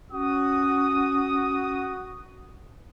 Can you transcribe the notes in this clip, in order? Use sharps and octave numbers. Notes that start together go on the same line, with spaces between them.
C#4 F#4 D#6